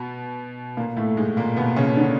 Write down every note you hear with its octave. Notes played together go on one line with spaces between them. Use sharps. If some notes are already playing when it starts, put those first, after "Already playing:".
Already playing: B2 B3
A#2 A#3
A2 A3
G#2 G#3
A#2 A#3
B2 B3
C#3 C#4
D3 D4